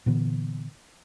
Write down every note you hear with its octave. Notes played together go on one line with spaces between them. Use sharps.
A#2 D3 E3 B3